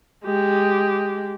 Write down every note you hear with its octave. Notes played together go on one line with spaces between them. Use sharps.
G#3 G4